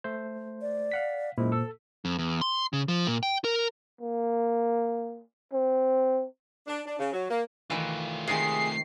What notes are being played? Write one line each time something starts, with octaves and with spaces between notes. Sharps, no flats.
A3 C5
D5
F5 F#5 B6
F#2 A#2 G#3 E4 C5
A4 E6
F2
E2
C6
C#3
F3
A#2
G5
A#4
A#3
C4
D4
D4
C#3
F#3
A#3
D#3 E3 A3 F4
C3 D#3 G#3 G#4 C7